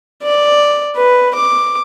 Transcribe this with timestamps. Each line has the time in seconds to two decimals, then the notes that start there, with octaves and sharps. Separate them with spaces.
0.23 D5
0.96 B4
1.35 D6